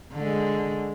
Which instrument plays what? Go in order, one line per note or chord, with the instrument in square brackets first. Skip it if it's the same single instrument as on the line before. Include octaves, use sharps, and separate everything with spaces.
[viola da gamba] D3 G#3